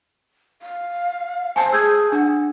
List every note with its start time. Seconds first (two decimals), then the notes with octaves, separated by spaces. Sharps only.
0.62 F5
1.56 C5 G#5 A5
1.72 G#4 E6 G6 G#6
2.12 D4 F#5